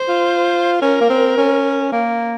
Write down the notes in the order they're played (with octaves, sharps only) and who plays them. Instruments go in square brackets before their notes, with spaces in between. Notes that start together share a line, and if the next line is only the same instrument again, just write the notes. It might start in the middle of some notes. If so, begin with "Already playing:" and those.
Already playing: [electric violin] C5
[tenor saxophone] F4
[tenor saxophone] C#4 [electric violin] A#4
[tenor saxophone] A#3
C4
C#4
A#3